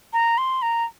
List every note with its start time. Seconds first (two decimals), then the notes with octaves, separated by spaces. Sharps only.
0.13 A#5
0.38 C6
0.62 A#5